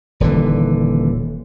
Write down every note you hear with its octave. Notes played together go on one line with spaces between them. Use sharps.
D#1 D3 E3